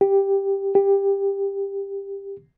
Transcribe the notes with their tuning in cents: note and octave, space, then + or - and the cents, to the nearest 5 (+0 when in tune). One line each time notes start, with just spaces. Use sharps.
G4 +5
G4 +15